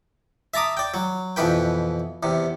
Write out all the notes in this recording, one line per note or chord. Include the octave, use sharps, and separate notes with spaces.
E5 A5 A#5 D6 D#6
D5 G5
F#3
F2 B2 E3 B4 G5
E2 C3